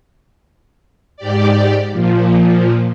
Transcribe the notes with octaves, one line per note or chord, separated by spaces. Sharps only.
G#2 G4 D5
A#2 F3